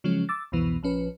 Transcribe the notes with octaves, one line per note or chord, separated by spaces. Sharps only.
C#3 F3 F#3 G#3 C#4
D6 E6 A6
C2 F2 B2 E3 B3
A#1 F3 C#4 B4